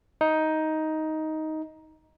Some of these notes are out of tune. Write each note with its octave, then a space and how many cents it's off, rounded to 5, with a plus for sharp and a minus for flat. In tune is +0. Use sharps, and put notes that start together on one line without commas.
D#4 +10